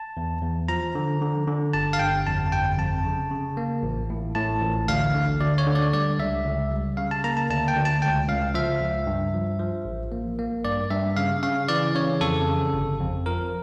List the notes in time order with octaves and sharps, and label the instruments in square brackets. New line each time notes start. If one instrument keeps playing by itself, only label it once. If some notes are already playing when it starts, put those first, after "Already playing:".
Already playing: [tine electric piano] A5
E2
E2
F3 A#5
D3
D3
D3
G1 A5
F5
G1 G5
F2 A5
G1 G5
F2 A5
C#3
C#3
A#3
A1
A2
A2 A5
A1
D2 F5
D3
D2 D5
C#5
D3
D5
G3 D5
C#2 E5
C#2
G3
C#3 F5
A5
A#3 A#5
A5
D2 A5
G5
D2
A5
C#2 G5
C#2 F5
F3 E5
C#2
G2
F3
F3
A1
A#3
A#3
G2 D5
G2 E5
C#3 F5
C#3 F5
E3 D5
C#3 C#5
F2 A4
C#3
G1
F2
F3 A#4